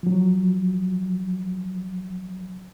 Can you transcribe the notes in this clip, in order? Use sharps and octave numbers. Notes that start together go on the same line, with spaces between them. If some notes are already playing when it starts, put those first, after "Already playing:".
F3 F#3